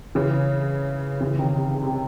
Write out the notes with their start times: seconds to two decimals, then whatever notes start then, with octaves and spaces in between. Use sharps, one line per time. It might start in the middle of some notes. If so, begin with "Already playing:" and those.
0.15 C#3 E3
1.21 C#3 E3
1.39 C3 D#3
1.56 C3
1.74 C#3
1.83 C3